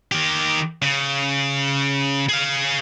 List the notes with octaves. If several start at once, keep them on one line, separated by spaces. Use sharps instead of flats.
D#3 G4
C#3
G#4 F5